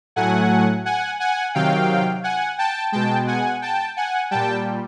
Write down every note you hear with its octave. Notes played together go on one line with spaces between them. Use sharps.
A2 F#3 A3 F#5 G#5
F#5 G#5
F#5 G#5
C3 D#3 F#3 F5 G5
F#5 G#5
G5 A5
B2 G#3 G5 A5
F#5 G#5
G5 A5
F#5 G#5
A#2 G3 G5 A5